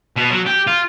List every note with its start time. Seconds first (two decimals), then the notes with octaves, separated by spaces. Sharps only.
0.16 B2
0.31 F#3
0.46 G4
0.67 F4